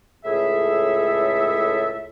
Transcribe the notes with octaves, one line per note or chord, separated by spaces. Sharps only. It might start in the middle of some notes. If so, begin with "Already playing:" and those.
C#2 A2 G#4 A4 E5